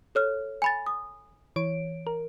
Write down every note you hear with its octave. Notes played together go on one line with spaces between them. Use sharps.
A4 C#5 F6
G#5 B5 A6
D#6
E3 C#5 D7
A#4